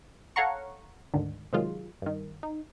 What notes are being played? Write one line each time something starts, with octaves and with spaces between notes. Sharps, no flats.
A4 C#5 F5 F#5 A#5 C#6
D2 G#2 D3 D#3
C3 D#3 F#3 G#3 F4
G2 D#3
D#4